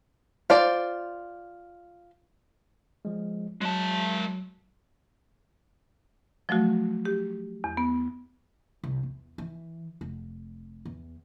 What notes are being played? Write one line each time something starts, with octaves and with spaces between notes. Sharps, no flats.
F4 C5 D5
F3 G#3
F#3 G#3 A5
F3 F#3 A3 F#4
G4
E2
B3
C2
E2
E3
F1
E2